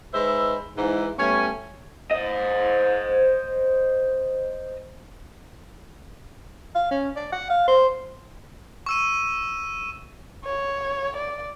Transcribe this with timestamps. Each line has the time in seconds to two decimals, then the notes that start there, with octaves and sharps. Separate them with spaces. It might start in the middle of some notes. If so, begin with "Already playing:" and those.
0.13 G#3 D#4 B4 C5 E5
0.76 G#2 E3
1.18 G3 A3 B3 C#4 C#5 G#5
2.12 C5 D#5
6.75 F5
6.91 C#4
7.17 D5
7.33 F#5
7.50 F5
7.68 C5
8.86 C#6 E6 D#7
10.45 C#5
11.16 D5